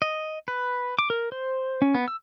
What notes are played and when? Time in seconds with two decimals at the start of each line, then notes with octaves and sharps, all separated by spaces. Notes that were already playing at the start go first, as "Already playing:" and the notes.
0.02 D#5
0.48 B4
0.99 D6
1.10 A#4
1.32 C5
1.82 C#4
1.95 B3
2.08 E6